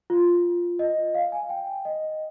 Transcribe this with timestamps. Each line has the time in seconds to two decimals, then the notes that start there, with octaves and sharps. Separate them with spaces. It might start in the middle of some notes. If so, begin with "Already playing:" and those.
0.10 F4
0.79 D#5
1.15 F5
1.32 G#5
1.49 G5
1.85 D#5